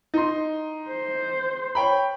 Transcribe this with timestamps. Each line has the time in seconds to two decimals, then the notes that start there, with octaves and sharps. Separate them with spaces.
0.14 D#4 C6
0.89 C5
1.75 C#5 G5 B5